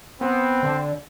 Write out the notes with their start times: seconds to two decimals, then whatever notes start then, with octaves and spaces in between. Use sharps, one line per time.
0.21 B3 C4
0.63 D3